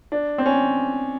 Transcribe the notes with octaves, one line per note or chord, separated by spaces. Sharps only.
D4
C4
C#4